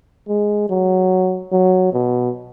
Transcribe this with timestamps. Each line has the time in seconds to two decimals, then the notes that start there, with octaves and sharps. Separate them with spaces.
0.29 G#3
0.70 F#3
1.52 F#3
1.93 B2